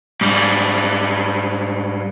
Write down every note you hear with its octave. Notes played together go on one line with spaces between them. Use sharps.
G#2 G3